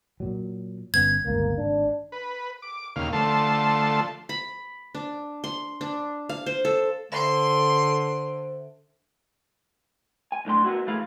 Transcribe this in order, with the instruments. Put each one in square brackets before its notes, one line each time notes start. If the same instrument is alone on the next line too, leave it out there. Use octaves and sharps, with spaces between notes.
[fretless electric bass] A#2 F#3
[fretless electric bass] G1 B3 C#4 [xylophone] G#6
[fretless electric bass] G1 C#2 [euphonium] A#3
[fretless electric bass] G#1 [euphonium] D4
[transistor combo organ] B4
D6
D#2 A#2 C#3 F5
D3 F3 A3 A5 C6
[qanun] B5
D4
C6
D4
F5
C5
A4
[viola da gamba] D3 [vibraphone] C5 E5 [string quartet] C6
[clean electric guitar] G#5
B1 A2 D4 C6
A#3 B3 E4 F#4
A2 E3 E4 G#4 F5 B5